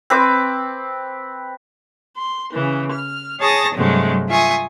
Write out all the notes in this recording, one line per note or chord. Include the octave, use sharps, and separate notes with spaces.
C4 B4 D6
C6
C#3 E3
F6
G#4 C#5 A5 D#6 A6 A#6
G2 C3 F#3 G#3 A3
F4 E5 G#5 C#6 D#6